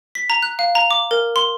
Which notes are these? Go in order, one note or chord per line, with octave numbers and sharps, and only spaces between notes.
B6
A#5
F#6
F5
A#5
D6
A#4
C6